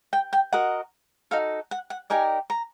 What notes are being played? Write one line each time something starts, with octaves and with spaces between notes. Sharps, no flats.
G5
G5
F#4 A#4 D#5 F#5
D#4 F#4 A4 F5
F#5
F#5
D#4 G4 A#4 D5 G#5
A#5